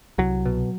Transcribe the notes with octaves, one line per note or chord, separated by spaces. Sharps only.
C2 F#3
B2